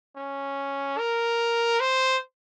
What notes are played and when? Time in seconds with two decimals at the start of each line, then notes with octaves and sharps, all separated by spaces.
0.16 C#4
0.98 A#4
1.80 C5